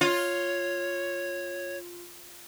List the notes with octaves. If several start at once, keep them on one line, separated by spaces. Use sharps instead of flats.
F4 C#5